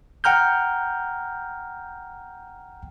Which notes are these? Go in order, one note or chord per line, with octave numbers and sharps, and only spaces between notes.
F#5 G5 A#5 F6 G6